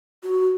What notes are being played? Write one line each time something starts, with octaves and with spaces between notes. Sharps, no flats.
F#4